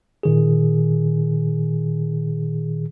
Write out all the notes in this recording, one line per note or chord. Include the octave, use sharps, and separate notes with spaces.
A#2 D#3 G#4